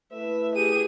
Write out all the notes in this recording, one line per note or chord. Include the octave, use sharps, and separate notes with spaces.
A3 E4 B4 E5
G4 G#4 D#7